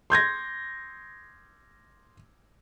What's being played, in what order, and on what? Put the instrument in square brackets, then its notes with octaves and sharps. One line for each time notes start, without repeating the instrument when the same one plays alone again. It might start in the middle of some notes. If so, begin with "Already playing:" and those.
[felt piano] C6 G6 G#6 A#6